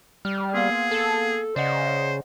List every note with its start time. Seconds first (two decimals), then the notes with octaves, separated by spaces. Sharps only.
0.25 G3 F6
0.54 A#3 B3 G#4 F5
0.91 A4
1.56 C#3 C5 D5 D#5 F#5